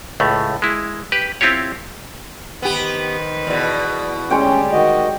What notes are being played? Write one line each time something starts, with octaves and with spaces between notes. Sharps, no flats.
C#2 A2 A3
G#3 E4
G4 B4
C4 E4 F4 G4 C#5
D#3 B3 G4 B4 C5
E2 B2
D2 G3 G#3 C#4 C#5 D5 G5
D#3 F#4 D#5